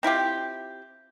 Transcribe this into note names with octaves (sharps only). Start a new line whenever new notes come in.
C4 E4 F4 G4